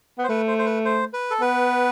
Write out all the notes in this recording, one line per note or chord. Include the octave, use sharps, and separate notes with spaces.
B3
C5
A3 B4
C5
C5
B4
C5
B4
A4
B3 B4